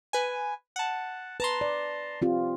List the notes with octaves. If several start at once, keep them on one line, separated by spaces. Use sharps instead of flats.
B4 G#5
F#5 A5
B4 A5 A#5 C6
D5
C4 F4 G4